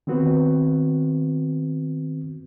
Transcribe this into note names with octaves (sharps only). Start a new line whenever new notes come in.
D#3 B3 C4 F#4 B4